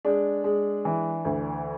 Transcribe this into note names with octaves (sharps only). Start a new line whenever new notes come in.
G#3 D4
G#3
E3
D2